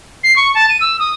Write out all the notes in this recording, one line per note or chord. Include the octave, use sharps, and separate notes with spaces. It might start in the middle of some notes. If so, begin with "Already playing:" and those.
C7
C#6
A5
D#7
E6
D#6